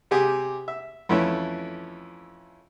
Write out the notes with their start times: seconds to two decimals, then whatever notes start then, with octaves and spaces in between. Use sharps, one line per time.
0.11 C3 G4 G#4
0.68 E5
1.09 F2 E3 A3 C#4 E4